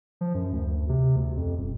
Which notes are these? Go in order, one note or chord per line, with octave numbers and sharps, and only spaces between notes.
F3
F#2
D2
C3
D2
F2
D#1